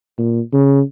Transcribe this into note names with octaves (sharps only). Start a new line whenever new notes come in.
A#2
C#3